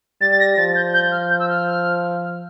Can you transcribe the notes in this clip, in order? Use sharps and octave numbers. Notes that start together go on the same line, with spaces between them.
G3 A6
A6
A#6
F3 A6
G6
G6
F6
G6
E6
F6